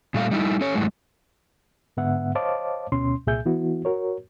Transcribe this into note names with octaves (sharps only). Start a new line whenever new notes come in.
A#2 G3 A3 F5
G3 D#4 E4
C#4 A4 C#5
F#2 A2 G#3
G#2 D3 B3 E5 F#5
C5 C#5 D#5 F5 A5 D6
D2 B2 C#4 C6
C2 A#2 G#4 E5 G#5 G6
E3 B3 E4 F#4
F#4 A#4 C#5